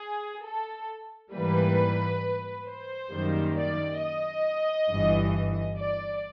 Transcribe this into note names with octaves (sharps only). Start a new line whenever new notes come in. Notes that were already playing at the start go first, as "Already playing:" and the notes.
Already playing: G#4
A4
G#2 E3 G3 A#3 B4
C5
F#2 D#3 G3 A#3
D5
D#5
G1 G2 E3
D5